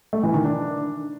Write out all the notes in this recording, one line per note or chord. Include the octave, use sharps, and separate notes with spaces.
A3
E3
D#3
D4